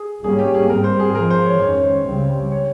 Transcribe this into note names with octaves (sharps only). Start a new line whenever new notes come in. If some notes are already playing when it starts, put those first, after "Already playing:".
Already playing: G#4
G#2 G3 A#3 C#4 G#4
G4
G#4
G#2 G3 C4 A#4
C5
G#4
G#4
G#2 F3 G#3 A#4
C5
C#5
F2 D#3 G#3 C#4 C#5
C5
C#2 C#3 G3 C4
C#5